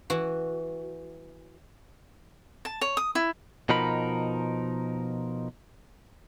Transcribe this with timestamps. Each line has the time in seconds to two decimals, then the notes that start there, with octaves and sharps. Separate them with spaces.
0.10 E3 F#4
2.65 A5
2.81 C#5
2.97 D#6
3.15 E4
3.69 B2 F3 D#4 A#4 B5